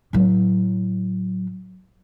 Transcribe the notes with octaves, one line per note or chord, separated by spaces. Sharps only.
A2 F#3